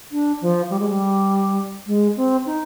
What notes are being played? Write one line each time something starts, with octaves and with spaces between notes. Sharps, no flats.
D4
F3
G3
G#3
G3
G#3
C4
D#4